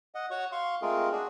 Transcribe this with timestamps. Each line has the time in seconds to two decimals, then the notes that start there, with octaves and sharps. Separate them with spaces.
0.15 D#5 F#5
0.31 F#4 C#5 F#5 C#6
0.52 F5 C6 C#6
0.82 G#3 A3 C4 F4 G#4 A#4
1.12 D4 F#4 G#4